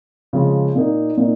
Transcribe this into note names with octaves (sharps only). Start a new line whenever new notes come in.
C#3 F3 G#3 F4
A#2 A#3 D#4
A#2 A#3 D#4